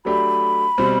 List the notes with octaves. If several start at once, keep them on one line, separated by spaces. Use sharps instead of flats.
F#3 A3 D4 G4 B5
B2 G3 C4